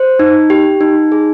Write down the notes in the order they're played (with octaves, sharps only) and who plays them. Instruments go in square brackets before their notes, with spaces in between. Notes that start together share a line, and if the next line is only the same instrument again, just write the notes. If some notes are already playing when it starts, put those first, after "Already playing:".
Already playing: [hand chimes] C5
D#4
G4
D#4
G#4